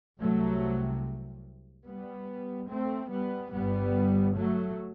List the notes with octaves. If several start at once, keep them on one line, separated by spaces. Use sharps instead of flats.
C2 C3 F#3 A3
G3 B3
A3 C4
G3 B3
G1 G2 G3 B3
F#3 A3